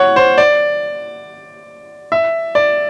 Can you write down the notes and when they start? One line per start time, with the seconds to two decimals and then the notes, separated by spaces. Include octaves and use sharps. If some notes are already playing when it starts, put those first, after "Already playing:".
Already playing: C#5 F#5
0.16 C5
0.38 D5
2.12 E5
2.55 D5